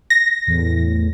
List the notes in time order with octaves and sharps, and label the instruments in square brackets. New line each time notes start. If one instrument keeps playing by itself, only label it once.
[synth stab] A#6
[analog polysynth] E2 A2